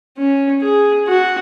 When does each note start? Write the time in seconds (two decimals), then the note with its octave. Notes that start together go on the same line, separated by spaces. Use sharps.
0.17 C#4
0.62 G#4
1.08 F#4